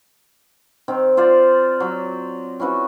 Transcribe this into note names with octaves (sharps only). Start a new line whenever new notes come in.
D#3 C4
F4 C5 D5
F#3
C#4 E4 F#4 B4